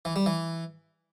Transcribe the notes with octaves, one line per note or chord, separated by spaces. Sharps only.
E3
G3
E3